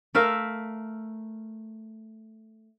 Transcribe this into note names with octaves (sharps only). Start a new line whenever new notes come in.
A3 A#4 E5 F5